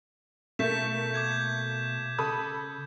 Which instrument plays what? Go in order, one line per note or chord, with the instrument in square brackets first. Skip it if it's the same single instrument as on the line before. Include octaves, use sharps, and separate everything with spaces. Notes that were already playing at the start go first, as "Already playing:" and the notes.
[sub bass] B2 [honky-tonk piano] A3 A#3 [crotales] G6 B6 E7
[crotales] D6 G6 G#6
[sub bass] C#3 [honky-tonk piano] A4 B5 D#6